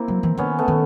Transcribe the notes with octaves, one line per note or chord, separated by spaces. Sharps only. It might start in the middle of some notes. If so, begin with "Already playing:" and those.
Already playing: A#3 C4 E4
F#3
E3
D#3 B3 C#4
A3 B3
D#3